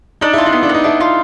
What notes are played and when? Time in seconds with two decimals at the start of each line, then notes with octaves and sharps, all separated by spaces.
0.21 D4 D#4
0.33 E4 F4
0.46 D#4
0.53 B3
0.63 D4
0.69 B3 D#4
0.84 D4 E4
1.01 F4